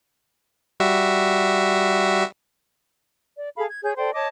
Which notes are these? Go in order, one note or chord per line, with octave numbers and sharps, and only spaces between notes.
G3 F#4 E5
D5
G#4 A4 F5 B5
G#6
G#4 C#5 G6
A4 C5 D5 G5
C#5 D#5 A5 D6